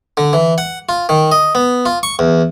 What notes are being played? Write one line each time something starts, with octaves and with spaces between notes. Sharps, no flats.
D3
E3
F#5
F4
D#3
D#5
B3
F4
C#6
E2